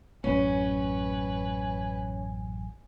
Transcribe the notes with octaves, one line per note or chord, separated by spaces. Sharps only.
A1 F#2 C#4 B4 G#5